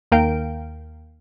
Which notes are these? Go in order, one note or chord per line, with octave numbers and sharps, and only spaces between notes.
D#2 A#3 A#4 F5 G5 D7